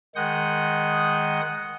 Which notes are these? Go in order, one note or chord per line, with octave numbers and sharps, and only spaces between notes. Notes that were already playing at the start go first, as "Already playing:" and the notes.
D#3 G#3 F#5 D#6 G6